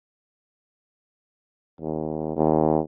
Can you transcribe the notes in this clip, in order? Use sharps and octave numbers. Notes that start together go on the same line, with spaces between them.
D#2
D#2